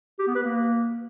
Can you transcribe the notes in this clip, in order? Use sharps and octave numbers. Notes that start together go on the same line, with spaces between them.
G4
B3
B4
A#3